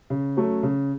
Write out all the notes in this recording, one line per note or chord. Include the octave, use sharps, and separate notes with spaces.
C#3
F#3 A3 C#4
C#3